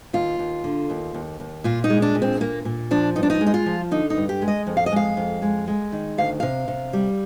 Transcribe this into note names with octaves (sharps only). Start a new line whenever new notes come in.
D#2 F4
D#2
D3
D#2
D#2
D#2
A#2 F4
D#4
G#3
D4
A#2
C4
A#2 A#3
A#2
F3 D4
G2 D#4
D4
D#4
G#3
D#4
F4
F3
D3 D#4
D#4
G2
G4
G#3
D#5
F2
F5
D#5
G#3 F5
F2
G#3
G#3
D#3
D2 F5
C3 F5
C3
G3